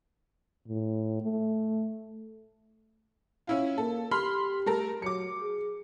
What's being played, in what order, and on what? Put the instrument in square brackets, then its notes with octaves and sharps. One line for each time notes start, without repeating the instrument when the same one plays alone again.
[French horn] A2
A3
[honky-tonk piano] C#4 E4 F4
[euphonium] A#3 [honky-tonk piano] A4
[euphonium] G4 [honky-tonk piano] B5 C6 F6
[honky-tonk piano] A3 A4 A#4
[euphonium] F#3 [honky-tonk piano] D6 C#7
[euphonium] G#4